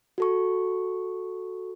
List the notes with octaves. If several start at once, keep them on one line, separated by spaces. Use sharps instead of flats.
F#4 A4 C#6